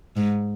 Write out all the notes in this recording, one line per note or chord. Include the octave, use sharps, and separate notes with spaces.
G#2